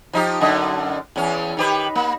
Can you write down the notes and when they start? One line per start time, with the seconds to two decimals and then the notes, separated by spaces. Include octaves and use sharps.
0.13 F3 D#4 G4
0.41 F#2 D3 D#5
1.16 E2 C#4
1.57 D#3 G4 B4
1.95 A#3